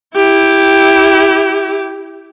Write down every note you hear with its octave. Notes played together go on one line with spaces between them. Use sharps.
E4 G4